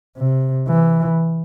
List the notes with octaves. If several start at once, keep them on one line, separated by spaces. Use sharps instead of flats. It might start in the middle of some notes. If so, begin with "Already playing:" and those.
C3
E3